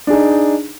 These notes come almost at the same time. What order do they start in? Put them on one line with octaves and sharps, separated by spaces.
D4 G#4 D#4